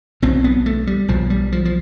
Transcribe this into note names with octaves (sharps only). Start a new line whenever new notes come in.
B1 B2 C4
B3
A3
G3
B1 B2 F3
G3
F3
F3